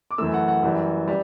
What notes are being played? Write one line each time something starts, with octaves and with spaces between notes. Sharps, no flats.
D6
F#2 E3 A3 E6
F#5
F#5
F#2 E3 G3
G3